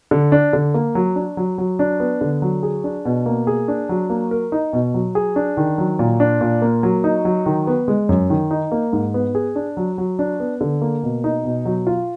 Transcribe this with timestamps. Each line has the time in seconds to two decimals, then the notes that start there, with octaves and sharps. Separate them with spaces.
0.11 D3
0.32 D4
0.53 D3
0.74 A#3
0.95 F#3
1.16 D4
1.37 F#3
1.58 F#3
1.79 D4
2.00 B3
2.21 D3
2.42 F#3
2.63 G#4
2.84 D4
3.05 B2
3.26 A#3
3.47 G#4
3.68 D4
3.89 F#3
4.10 A#3
4.31 A#4
4.52 D#4
4.73 B2
4.94 F#3
5.15 G#4
5.36 D4
5.57 D#3
5.78 F#3
5.99 A#2
6.20 D4
6.41 A#2
6.62 A#3
6.83 F#3
7.04 D#4
7.25 F#3
7.46 D#3
7.67 B3
7.88 G#3
8.09 F#2
8.30 D#3
8.51 D#4
8.72 A#3
8.93 G#2
9.14 B3
9.35 G#4
9.56 D4
9.77 F#3
9.98 F#3
10.19 D4
10.40 B3
10.61 D3
10.82 A#3
11.03 B2
11.24 D#4
11.44 B2
11.65 F#3
11.87 F4